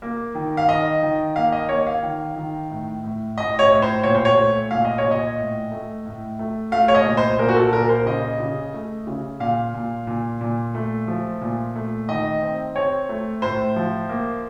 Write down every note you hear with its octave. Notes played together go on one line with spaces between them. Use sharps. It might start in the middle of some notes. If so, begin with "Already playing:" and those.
A#3
D#3
F5
D#3 D#5
D#3
A#3 F5
D#5
A#3 C#5
F5
D#3
D#3
A2
A2
A2 D#5
C#5
A2
C5
A#2 C#5
C5
C#5
A3
A#2 F5
D#5
C#5
A#2
D#5
A2
A3
A2
A3
A3 F5
C#5
D#5
A#2
C5
A#2 A#4
F#4
A4
A#2 A#4
C5
C#3 D#5
C#3
A3
C#3
A#2 F5
A#2
A#2
A#2
A3
F3
A#2
A3
D#3 D#5
C4
C4 C#5
A3
A2 C5
F3
A#3